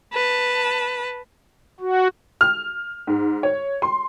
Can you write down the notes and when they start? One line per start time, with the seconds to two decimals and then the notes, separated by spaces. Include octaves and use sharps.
0.13 B4 A5
1.80 F#4
2.41 F6
3.07 G#2
3.43 C#5
3.82 C6